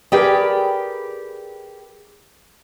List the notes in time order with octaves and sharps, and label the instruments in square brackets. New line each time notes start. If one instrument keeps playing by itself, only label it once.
[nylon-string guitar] G4 G#4 A#4 B4 D5 G5